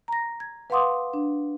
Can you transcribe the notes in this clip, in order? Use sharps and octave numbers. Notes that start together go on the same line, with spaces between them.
A#5 A#6
G#6
B4 F5 F#5 C6 D6 D#6
D4